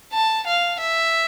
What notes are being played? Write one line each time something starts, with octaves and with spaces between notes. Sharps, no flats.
A5
F5
E5